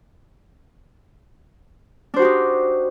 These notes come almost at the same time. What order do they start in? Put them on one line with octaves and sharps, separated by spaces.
D4 C5 F#4 G4 D#4